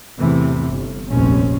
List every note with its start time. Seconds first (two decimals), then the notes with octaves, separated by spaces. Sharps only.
0.18 E2 A2 C3 E3
0.68 G1
1.09 F1 A#1 D#2 C4 C#4